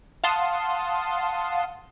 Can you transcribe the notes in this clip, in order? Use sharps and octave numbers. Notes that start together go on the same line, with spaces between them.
F5 F#5 A5 C6 D#6